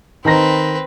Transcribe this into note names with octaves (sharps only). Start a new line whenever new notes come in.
D#3 C4 B4 A#5 A#6